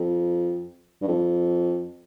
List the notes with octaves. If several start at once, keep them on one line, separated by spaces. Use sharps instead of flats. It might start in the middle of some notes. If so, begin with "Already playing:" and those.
Already playing: F2
G2
F2